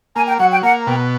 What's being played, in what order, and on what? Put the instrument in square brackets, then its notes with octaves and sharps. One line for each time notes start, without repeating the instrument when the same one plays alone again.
[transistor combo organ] A#3 [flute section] G#5
[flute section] G5
[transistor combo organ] F#3 [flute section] F#5
[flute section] G5
[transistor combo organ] A#3 [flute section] F#5
[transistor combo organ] B2 [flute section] G5